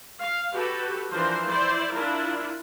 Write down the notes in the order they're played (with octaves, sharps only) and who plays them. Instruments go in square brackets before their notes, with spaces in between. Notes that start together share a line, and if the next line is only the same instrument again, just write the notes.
[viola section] F5
F#4 G4 A4 B4
E3 F3 D4 A#4 C5
E4 C5 D5
D4 E4 F4 A#4